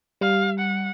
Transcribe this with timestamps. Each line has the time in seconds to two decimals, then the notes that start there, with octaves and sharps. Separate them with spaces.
0.21 G3 F5
0.59 F#5